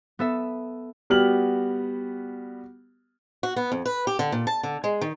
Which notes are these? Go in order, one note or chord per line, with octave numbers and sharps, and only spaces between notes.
B3 A4 E5
G3 B3 F#4 G4 F6 F#7
F#4
B3
F2
B4
G4
D3
A#2
A5
D3
G#3
D#3